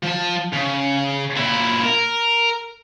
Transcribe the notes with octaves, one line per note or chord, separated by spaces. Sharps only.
F3 A5
C#3
A#2 E4
A#4